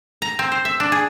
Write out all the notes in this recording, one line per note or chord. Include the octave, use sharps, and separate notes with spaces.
A#5
C4
C5
E5
D4
G#4